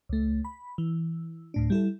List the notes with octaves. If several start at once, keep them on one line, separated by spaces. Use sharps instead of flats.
C#2 A3
B5
E3
D2 A2 D4
G3 E4 A4